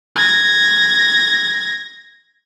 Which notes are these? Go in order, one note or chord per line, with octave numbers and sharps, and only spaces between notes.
G#6 A#6